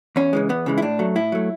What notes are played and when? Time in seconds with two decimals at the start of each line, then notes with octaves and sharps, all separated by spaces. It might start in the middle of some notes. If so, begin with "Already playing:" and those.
0.16 E2 C#4
0.33 C#3 E3 G#3
0.49 E2 B3
0.66 C#3 E3 G#3
0.78 E4
0.82 A2 D4
0.99 F#3 A3
1.15 A2 E4
1.32 F#3 A3